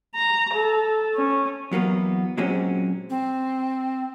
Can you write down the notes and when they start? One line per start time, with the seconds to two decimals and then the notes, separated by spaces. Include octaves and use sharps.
0.15 A#5
0.54 A4
1.15 C#4
1.72 E2 F#3 A#3 B3
2.37 A#2 F#3 G#3 C4 C#4 F#4
3.10 C4